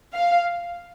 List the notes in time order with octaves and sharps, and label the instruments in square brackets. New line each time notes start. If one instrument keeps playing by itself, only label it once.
[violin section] F5